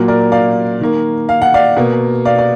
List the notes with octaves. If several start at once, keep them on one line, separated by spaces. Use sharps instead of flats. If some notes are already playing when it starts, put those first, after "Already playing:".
Already playing: A#2 F#3 A#3
A#4 D5
D5 F5
D#3 A#3
F5
F#5
D5 F5
B2 A#3
D5 F5
D5